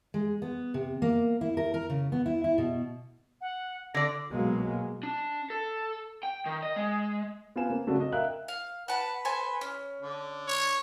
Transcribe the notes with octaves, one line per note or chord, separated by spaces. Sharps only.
G#3
B3
C3
A#3
E4
A#4
A#4
C#3
B3
E4
E4
B2
F#5
D3 D5 A#6
B2 F#3 G#3 A#3
D4
A4
G5
D#3
D#5
G#3
B3 F4 C5 G#5 E7
A#3
C#3 F#3 A3 C4 D4 F#4
D#5
A#4 E5 F5 G5 F#6
F5
B4 F#5 A5
A4 C5 G#5
C#4
D3
C#5